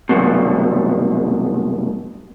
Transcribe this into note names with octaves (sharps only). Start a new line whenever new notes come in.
C2 F#2 B2